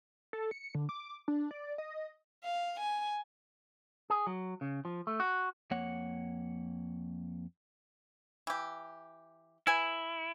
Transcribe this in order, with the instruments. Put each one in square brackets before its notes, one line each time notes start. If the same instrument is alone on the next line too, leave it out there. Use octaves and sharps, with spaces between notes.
[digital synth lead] A4
C#7
D3
D6
D4
D5
D#5
[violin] F5
G#5
[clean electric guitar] G#4
F#3
C#3
F3
A3
F#4
F2 A#3 C#5 F#5
[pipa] E3 G4
[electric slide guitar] E4 [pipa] B4 G#5